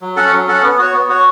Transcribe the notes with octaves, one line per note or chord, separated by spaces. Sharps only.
F#3
C#4 A4 F#5
F#3
C#4 A4 F#5
B3
F#4 C#5
B3
F#4 C#5